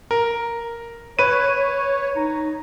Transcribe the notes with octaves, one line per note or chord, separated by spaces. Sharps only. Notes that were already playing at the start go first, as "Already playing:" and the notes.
A#4
B4 C#5 D#7
D#4